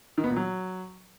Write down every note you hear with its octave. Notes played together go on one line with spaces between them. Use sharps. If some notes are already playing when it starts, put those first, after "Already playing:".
D#3
B3
A#2
F#3